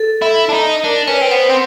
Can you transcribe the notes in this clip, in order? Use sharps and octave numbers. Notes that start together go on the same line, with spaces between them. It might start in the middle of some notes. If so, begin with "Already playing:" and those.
Already playing: A4
E4
D4
D#4
D4 A#4
C#4 B4
C4
B3 C5
C4